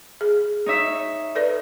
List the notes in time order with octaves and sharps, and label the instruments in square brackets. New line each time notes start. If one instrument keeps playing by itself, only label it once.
[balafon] G#4
[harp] D#4 C#5 E5
[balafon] A4 B4 D5